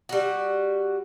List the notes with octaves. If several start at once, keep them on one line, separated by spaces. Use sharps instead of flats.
G3 F#4